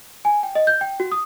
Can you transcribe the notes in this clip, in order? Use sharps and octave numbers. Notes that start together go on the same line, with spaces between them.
G#5
G5
D#5
G6
G5
F#4
D#6